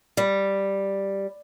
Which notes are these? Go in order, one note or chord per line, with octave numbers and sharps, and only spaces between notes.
G3